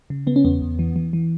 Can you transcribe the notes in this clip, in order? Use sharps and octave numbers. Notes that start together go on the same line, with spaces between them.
C#3
C#3 B3
C#4
E2 B3
E2
E3
E3
E3